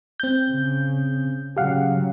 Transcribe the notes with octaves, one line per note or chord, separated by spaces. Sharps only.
C4 G6
C#3
C#3 F#3 G4 F5 F#5